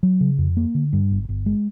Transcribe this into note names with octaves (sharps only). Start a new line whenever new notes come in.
F#3
C#3
F2
A#3
D3
G2
G1
G1
G#3